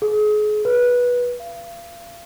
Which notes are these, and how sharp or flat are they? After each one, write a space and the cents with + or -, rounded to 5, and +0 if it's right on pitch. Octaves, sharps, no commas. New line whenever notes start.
G#4 +35
B4 -15
F5 -35